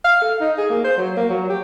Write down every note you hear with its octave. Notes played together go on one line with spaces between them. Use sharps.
F5
A4
D#4
G#4
A#3
C5
F#3
A#3
F#3
G4